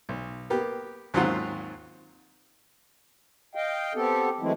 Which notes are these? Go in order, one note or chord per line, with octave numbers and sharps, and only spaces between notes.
B1
A#3 B3 G4
D#2 G#2 F#3 C4 F4 F#5
D#5 F5 G5
B3 C4 G4 A4
E3 F#3 G#3 A3 C4 E4